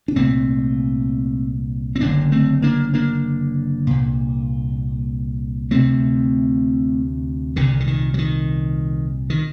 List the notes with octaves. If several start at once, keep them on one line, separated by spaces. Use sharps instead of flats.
D4
C2 A#2 A3 C4
C4
F#1 F#2 D3 A#3 D4
A3 C4
A#3 D4
A#3 D4
C2 A#2
D2 C3 A3 C4
C2 A#2 D3
D3
D#3
F#3
D#3
D#3